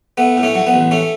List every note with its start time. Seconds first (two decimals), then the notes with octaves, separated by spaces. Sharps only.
0.17 A3 B3
0.37 A2
0.43 A3 C#4
0.55 F#3
0.67 B3
0.74 A1
0.91 A3 C#4